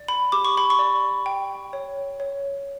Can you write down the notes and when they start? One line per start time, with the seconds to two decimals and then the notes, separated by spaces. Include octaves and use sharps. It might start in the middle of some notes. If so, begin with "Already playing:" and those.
Already playing: D5
0.08 B5
0.32 G4 D6
0.45 C#6
0.57 B5
0.70 C#6
0.79 D5
1.26 G5
1.73 C#5
2.20 C#5